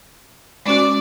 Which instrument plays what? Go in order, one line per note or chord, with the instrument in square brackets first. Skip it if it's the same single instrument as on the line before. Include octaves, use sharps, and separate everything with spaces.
[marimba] G#3 C#4 F#4 [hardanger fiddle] D5